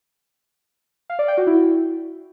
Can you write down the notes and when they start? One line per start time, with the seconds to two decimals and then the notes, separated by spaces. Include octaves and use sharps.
1.10 F5
1.19 D5
1.28 G5
1.37 F#4
1.47 E4